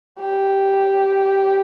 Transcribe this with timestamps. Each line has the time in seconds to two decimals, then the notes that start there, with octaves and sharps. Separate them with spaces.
0.20 G4